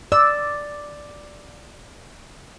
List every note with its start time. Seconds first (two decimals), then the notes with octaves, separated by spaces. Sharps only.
0.12 D5 E6